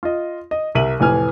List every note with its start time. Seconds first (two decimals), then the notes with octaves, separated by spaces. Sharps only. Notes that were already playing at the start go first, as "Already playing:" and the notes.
0.03 F4 D#5
0.51 D#5
0.75 C2 A#4 E5 D#7 F#7
1.00 F1 A2 E3 G#5 F6